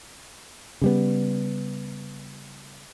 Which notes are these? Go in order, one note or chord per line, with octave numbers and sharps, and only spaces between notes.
C#3 G3 B3